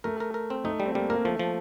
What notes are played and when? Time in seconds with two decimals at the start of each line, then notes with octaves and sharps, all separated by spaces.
0.04 A3 A#4
0.20 A#4
0.34 A#4
0.50 C4
0.64 A3 D#4
0.80 G3
0.86 C4
0.95 G3 A#3
1.10 A#3 A#4
1.25 F3 A3
1.39 F3